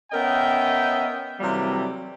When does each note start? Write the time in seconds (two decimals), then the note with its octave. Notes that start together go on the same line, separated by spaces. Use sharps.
0.12 B3 C#4 A#4 D#5 E5 G5
1.40 C3 E3 F#3 G3 A3 A#3